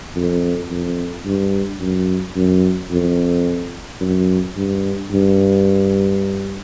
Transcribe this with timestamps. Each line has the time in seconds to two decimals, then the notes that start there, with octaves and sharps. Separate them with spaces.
0.16 F2
0.71 F2
1.25 G2
1.81 F#2
2.36 F#2
2.91 F2
4.01 F#2
4.56 G2
5.11 G2